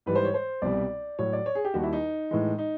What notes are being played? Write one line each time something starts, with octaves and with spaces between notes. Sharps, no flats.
G#2 E3 G3 B4
C5
C#5
C5
C2 B2 G3 D5
A2 F#3 C#5
D5
C#5
G#4
G4
D#2 D#3 G3 F#4
E4
D#4
A2 E3 G#3
D#4